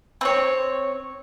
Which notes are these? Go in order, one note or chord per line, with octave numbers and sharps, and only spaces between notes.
C4 C#5